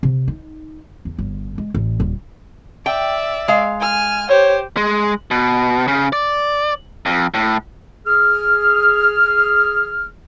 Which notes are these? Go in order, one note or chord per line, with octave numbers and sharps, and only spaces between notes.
C3
D#4
E2
G1
G#3
A1
D#1
D5 E5 G5
G#3 F5
G#5 F6
G4 C5 C#5
G#3
B2
C#3
D5
F2
A2
G#4 F6